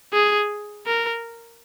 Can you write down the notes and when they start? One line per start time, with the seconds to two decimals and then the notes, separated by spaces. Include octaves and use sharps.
0.13 G#4
0.86 A#4